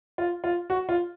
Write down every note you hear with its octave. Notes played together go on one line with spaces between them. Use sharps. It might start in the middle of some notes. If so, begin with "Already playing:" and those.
F4
F4
F#4
F4